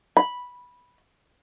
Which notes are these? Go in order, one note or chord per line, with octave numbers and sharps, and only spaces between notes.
B5